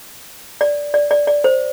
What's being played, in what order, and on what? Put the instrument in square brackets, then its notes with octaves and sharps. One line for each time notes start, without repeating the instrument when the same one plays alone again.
[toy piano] D5
D5
D5
D5
C5